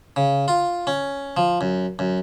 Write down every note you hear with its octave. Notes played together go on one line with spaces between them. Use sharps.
C#3
F4
C#4
F3
F#2
F#2